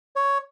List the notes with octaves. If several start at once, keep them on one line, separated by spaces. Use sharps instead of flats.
C#5